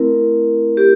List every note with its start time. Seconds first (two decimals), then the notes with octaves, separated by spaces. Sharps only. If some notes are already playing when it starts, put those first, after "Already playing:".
Already playing: A3 C4 E4 A#4
0.77 G4